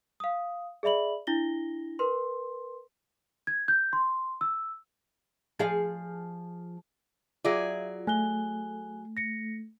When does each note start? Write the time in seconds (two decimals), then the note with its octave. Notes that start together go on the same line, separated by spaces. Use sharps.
0.20 F5 D#6
0.83 G#4 D5 E5 B5 F#7
1.27 D4 E4 A#6 G7
1.99 A#4 B4 C6
3.47 G#6
3.68 G6
3.93 C6
4.41 E6
5.59 F3 G#4 F5
7.45 F#3 F4 G#4 D5 E5
8.07 A3 G#5 F#6 G7
9.17 A#6 C#7